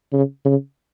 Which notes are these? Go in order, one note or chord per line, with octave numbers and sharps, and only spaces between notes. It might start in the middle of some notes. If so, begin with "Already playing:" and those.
C#3
C#3